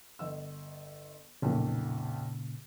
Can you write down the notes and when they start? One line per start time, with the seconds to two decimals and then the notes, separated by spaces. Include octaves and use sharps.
0.19 G1 D#5 E6
1.42 B1 F2 A#2 C#3